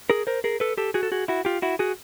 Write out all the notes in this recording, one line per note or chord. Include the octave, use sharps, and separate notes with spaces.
G#4 A#4
A#4 C5
G#4 A#4
A4 B4
G4 A4
F#4 G#4
A4
F#4 G#4
E4 F#4
F4 G4
E4 F#4
F#4 G#4